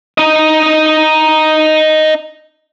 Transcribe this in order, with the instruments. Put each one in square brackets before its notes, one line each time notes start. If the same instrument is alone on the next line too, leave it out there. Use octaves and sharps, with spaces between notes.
[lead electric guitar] D#4 D#5